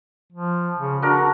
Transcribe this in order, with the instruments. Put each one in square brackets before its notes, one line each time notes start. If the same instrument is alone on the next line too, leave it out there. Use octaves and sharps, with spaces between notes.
[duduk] F3
C#3
[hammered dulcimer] D4 A#4 [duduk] F#4